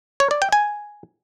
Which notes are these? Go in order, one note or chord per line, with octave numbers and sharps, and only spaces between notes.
C#5
D5
G5
G#5